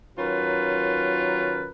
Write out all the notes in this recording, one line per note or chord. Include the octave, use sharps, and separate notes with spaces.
D#3 F#3 C#4 F4 A#4 B4